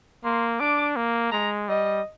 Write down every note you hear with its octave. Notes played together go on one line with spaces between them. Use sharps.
A#3 C6
D4 D6
A#3
G#3 A#5
G3 D#5